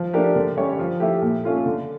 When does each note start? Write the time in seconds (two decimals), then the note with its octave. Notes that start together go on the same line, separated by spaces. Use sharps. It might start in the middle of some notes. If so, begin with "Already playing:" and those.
Already playing: F3
0.14 A3 D4 G4 A#4
0.36 D3
0.57 G3 C#4 G4 C#5
0.79 F3
1.00 A3 E4 G4
1.22 A#2
1.44 A3 C#4 F4 A4
1.66 D3